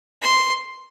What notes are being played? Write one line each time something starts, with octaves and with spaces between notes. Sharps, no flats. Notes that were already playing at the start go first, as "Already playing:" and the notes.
C6